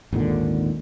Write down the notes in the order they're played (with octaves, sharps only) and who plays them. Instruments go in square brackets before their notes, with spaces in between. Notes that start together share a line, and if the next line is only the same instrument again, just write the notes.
[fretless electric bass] G#1 D#2 A#2 D3